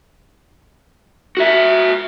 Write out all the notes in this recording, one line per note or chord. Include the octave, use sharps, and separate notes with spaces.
F#4 E5